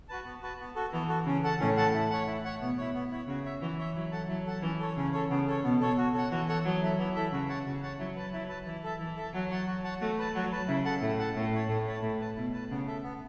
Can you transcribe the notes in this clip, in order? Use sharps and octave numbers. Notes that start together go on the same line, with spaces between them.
F#4 B4 A5
B3
F#4 B4 A5
B3
F#4 A4
E3 B3
F#4 A4
C#3 C#4
A4 F#5 A5
A2 C#4
A4 F#5 A5
E4
C#5 F#5
E4
C#5 F#5
B2 B3
E4 C#5
B3
E4 C#5
C#3 F#4
C#5 E5
E3 F#4
C#5 E5
F#3 E4
A4 F#5 A5
F#3 E4
A4 F#5 A5
E3 C#4
A4 C#5
C#3 C#4
A4 C#5
C#3 B3
A4 C#5
B2 B3
A4 C#5
F#4
A4 C#5 F#5
E3 F#4
A4 C#5 F#5
F#3 B3
E4 A4 E5
E3 B3
E4 A4 E5
C#3 F#4
C#5 F#5 A5
C#3 F#4
C#5 F#5 A5
F#3 E4
B4 A5
F#3 E4
B4 A5
E3 E4
A4 E5 A5
E3 E4
A4 E5 A5
F#3 F#4
C#5 F#5 A5
F#4
C#5 F#5 A5
A3 F#4
B4 A5
F#3 F#4
B4 A5
C#3 E4
A4 F#5 A5
A2 E4
A4 F#5 A5
A2 A3
E4 C#5 A5
A2 A3
E4 C#5 A5
A2 E4
B4 A5
B2 E4
B4 A5
C#3 B3
A4 E5
B3